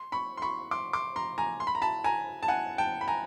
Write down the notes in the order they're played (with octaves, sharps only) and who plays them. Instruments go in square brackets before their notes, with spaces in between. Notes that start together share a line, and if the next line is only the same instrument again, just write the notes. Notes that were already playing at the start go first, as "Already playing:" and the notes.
Already playing: [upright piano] C6
B5 C#6
C6
B5 C#6
C6 D6
C6 D6
A#5 C6
G#5 A#5
C6
B5
A#5
A5 B5
G#5 A#5
A5
F#5 G#5
G5 A5
B5
G#5 A#5